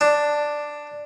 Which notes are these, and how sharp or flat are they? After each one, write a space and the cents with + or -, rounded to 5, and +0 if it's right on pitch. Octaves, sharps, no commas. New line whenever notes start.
D4 +5